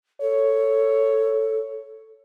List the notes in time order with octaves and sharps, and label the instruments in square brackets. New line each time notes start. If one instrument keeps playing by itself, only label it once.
[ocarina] A4 [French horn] C#5